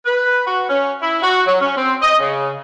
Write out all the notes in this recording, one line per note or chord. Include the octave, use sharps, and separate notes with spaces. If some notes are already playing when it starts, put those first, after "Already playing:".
B4
F#4
C#4
E4
F#4
F#3
C#4
C4
D#5
C#3